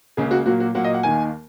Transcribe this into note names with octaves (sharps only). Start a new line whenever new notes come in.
C#2 C#3 A#3 G#4
F#4
A#2 F#3 A#3 F#4
F#4
A#2 F#3 A#3 F#5
D#5
F#5
D#2 D#3 A#3 G#5